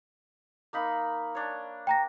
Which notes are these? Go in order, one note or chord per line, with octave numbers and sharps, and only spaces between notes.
A#3 D#4 B5
D4 C#5
G5 A#5 A#6